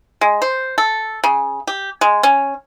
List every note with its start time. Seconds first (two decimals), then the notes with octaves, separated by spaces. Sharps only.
0.21 G#3
0.42 C5
0.78 A4
1.24 C#3
1.67 G4
2.01 G#3
2.23 C#4